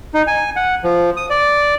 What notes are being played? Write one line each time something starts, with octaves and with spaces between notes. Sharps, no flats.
D#4
G#5
F#5
F3
D#6
D5